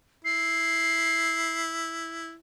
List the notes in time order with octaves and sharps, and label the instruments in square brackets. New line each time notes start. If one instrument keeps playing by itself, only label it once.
[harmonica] E4 [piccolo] C7